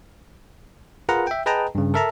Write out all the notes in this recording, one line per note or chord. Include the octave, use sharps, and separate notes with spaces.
F4 G#4 A#4 B4 F#5 A#5
E5 G5
G#4 B4 D#5 G5 A5 A#5
G2 C#3
A4 A#4 E5 A5 A#5